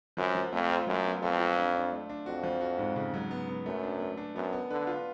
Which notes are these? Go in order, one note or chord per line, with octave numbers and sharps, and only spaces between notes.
F#2 F3
F3
F2 A3
F4
F#2 F#3
B3
F2 A4
F4
D4
D4
A3
D4
F2 F#4
F3
F#4
G#2
C#3
F#3
B3
B3
F#2 A3
D4
A3
D4
F#2 B3
B3
D3 B4
F4